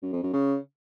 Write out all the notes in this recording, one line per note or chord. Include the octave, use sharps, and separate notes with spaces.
F#2
F2
F#2
C#3